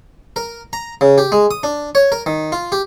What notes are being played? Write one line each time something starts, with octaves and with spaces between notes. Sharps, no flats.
A#4
A#5
C#3
G4
G#3
D#6
D4
C#5
A#4
D#3
F4
G4